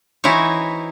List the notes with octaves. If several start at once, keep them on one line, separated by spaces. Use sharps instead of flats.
E3 D#4 E4 F#4 C5 C#5